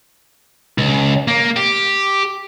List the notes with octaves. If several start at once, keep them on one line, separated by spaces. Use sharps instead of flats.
C#2
A#3
G4